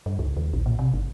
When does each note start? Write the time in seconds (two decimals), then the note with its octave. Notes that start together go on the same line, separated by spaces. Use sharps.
0.06 G2
0.19 C#2
0.37 D#2
0.53 A#1
0.66 A#2
0.79 C3
0.94 G1